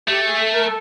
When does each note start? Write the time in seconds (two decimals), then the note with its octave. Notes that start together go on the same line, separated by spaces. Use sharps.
0.08 A3 G4
0.24 G#4
0.40 A4
0.52 A#4
0.64 A4